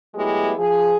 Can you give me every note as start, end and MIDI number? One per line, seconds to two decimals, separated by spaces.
0.15 0.52 54
0.15 0.52 56
0.15 0.52 57
0.15 0.52 59
0.15 0.52 64
0.15 0.52 67
0.58 0.97 53
0.58 0.97 68